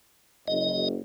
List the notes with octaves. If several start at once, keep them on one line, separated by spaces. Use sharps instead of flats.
F#1 D#5